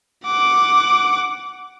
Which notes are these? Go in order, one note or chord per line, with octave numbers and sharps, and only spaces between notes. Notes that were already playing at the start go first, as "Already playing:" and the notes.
F#5 D6